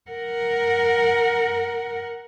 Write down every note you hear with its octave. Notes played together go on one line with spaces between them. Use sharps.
A#4 F#5